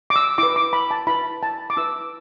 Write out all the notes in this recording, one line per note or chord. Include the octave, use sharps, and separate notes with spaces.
D6
E6
E4 B4 D6
D6
B5
A5
E4 B4 B5
A5
D6
E4 B4 E6